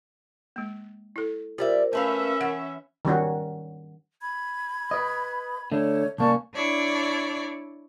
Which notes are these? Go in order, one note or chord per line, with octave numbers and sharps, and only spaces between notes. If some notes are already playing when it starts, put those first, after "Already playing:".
G#3 A#3
E4 A4
G3 F4 A#4 C5 D5 E5
A3 C#4 A#4 B4 E5 F5 B5
E3 F#5
D#3 G3 C#4 F#4
B5 G#6
B4 D#5
D3 A3 C#5
C2 A#3 C#4 D5 A5 C#6
D4 E4 C#5 D5